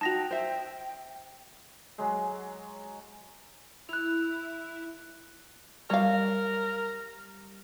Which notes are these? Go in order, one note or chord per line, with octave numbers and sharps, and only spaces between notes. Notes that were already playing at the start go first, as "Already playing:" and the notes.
D#4 F#4 G5 A5 A#6 F7
C5 E5
F#3 G#3
E4 F#6 F7
G3 A#4 C#5 F5